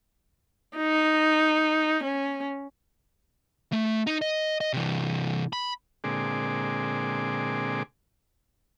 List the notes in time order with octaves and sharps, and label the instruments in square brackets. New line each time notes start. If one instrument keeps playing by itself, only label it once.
[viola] D#4
C#4
[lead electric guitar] A3
D#4
D#5
D#5
C3 E3
B5
[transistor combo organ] A#2 D3 G#3 C4 G#4 D6